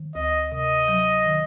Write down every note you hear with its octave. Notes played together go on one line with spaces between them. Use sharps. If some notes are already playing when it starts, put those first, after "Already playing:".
Already playing: D#3
D2 D#5
C3 D#5
F#3
D#3